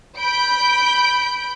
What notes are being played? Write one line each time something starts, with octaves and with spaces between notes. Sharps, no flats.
B5 G6 D7